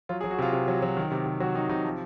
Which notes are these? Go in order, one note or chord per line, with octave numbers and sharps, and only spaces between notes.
F#3 F4
G#4
F#3
F#4
C3 F4
C3
F#3
F#3
D#3
C3
C3
F#3 F#4
D#3 D#4
C3 D#4
F3